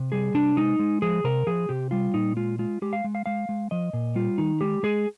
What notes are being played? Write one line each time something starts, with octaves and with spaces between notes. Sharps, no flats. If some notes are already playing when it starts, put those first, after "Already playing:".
Already playing: C3
G3 G#4
C3 D4
G#3 D#4
G#3
F3 G#4
C3 A#4
F3 G#4
C3 G4
G3 F4
A#2 D#4
G#3 F4
G#3 F4
G#3 G4
F5
G#3
F5
G#3 F5
G#3
F3 D#5
A#2
G3 F4
D#3 D#4
G#3 G4
G#3 G#4